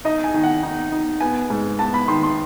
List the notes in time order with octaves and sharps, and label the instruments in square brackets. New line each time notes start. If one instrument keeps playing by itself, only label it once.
[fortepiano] D#4 [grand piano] D#5
[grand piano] G#5
[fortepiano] D#3
[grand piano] F#5
[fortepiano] D#4
D#4
[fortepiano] B3 [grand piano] G#5
[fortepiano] G#2
[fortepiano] B3 [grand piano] A5
[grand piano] B5
[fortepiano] D#3 [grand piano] C6
[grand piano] C6